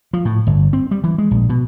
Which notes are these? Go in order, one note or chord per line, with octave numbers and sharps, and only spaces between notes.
F3
A2
G1
C4
G3
E3
G#3
A#1
B2